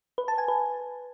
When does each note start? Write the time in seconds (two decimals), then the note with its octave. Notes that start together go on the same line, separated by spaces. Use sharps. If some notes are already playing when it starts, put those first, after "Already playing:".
0.18 B4
0.28 A5
0.38 G#5
0.48 B4